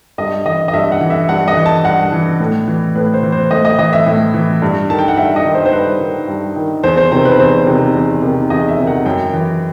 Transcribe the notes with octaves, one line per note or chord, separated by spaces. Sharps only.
G2 D#5
E3 D#5
D#5
G2 E5
F#5
E3
E5
G2 F#5
D#5
E3
A5
G2 F#5
E3
A2
E3
A2 B4
C5
E3
C5
A2 D#5
D#5
E3 D#5
E5
A2
E3
G2
D#3 A5
G5
F#5
G2 E5
D#5
D#3
C5
C5
G2 B4
D#3
G2
D#3
E2 C5
C5
C3 D#3 C5
B4
E2 C5
C3 D#3
E2
C3 D#3
E2 D#5
E5
C3 D#3
F#5
F#2 G5
E3